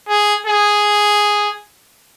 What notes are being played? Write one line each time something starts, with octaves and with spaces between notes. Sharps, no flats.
G#4
G#4